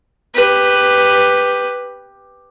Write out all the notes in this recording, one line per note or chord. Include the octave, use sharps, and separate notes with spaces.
G4 B4